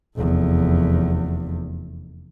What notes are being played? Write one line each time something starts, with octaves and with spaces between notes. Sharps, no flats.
F1 E2